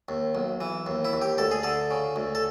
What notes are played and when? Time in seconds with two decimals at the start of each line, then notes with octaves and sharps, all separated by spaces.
0.09 D#2
0.35 B1
0.61 E3
0.86 D#2
1.05 E4
1.13 D#2
1.22 G4
1.38 D2 A4
1.51 G#4
1.63 D3 A4
1.91 C#3
2.16 D2
2.35 A4